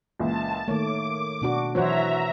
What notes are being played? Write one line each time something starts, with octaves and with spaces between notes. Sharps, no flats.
C#2 A#2 E3 A5
D#3 A3 A#3 C#5 D6
B2 D4 F#4
E3 F#3 F#4 C5 C#5 E5 A#5